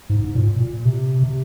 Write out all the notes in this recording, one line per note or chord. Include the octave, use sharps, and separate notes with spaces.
G#2
G#2
A#2
A#2
C3
C3